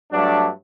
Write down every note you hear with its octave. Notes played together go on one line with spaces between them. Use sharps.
G2 F#3 A3 D4